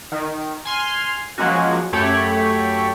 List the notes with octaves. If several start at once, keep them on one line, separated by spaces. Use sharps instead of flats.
D#3
G#5 C6 F6
F3 F#3 G#3 A#3 C#4 F#4
F#2 A3 G4 C#5 B5